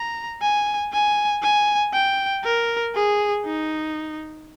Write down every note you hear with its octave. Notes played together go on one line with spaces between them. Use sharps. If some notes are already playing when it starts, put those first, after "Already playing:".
Already playing: A#5
G#5
G#5
G#5
G5
A#4
G#4
D#4